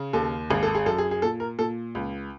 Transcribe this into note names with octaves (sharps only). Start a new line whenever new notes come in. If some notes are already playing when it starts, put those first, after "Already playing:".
Already playing: C#3
D#2 A4
G#1 G#4
A4
G#4
F#2 A4
G#4
G#4
A#2 A4
A#4
A#2 A4
C#2